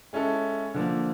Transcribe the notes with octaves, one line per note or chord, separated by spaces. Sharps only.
G#3 C#4 E4 A4
D3 F3 A#3